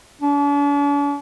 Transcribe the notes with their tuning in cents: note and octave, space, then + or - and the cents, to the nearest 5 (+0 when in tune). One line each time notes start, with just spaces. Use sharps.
D4 -45